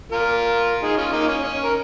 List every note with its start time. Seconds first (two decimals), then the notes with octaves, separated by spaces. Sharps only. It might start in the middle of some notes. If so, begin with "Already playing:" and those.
0.12 F4 A#4
0.82 D#4 G#4
0.97 C#4 F4
1.13 A#3 D#4
1.28 C#4
1.43 C#4
1.63 A#4